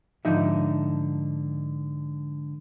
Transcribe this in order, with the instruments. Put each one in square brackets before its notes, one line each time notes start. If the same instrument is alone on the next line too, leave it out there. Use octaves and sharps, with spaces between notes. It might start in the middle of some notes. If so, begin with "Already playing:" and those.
[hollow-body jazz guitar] G#2 D3 F3 D#4 D#5 E5